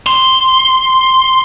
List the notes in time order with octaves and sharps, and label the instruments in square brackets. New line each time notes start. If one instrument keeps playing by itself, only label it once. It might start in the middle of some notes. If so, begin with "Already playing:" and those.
[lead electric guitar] C6